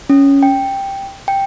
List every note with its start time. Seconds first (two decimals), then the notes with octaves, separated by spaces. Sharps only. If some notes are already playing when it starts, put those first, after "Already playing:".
0.10 C#4
0.43 G5
1.28 G5